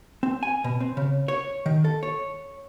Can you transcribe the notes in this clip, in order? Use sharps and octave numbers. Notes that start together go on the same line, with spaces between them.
C4
G#5
B2
C4
C#3
C#5
D#3
A4
C#5